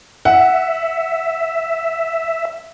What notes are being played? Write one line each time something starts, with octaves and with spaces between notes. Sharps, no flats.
E5 F#5